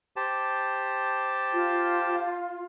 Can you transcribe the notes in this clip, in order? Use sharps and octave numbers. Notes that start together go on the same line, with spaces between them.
G4 C5 A5
F4